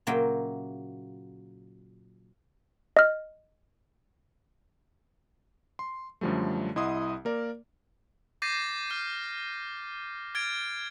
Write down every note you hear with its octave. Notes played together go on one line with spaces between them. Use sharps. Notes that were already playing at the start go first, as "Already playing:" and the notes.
A#2 C#3 F#3 A#3 E5 G5
D#5 F6
C6
F#2 D3 F3 G3 A3
C2 E4 D#5 F#5 C6 D#6
A#3 A#4 D5
D6 G6 A6 A#6 C7 D#7
F6 C7
F6 G#6 A6 D7